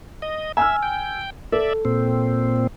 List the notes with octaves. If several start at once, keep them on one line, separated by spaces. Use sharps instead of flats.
D#5
E5 G#5 E6 F6
G5
A4 D5 E5
A#2 C4